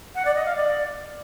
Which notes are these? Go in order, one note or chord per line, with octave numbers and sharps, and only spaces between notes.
F#5
D5
D#5
F5
D5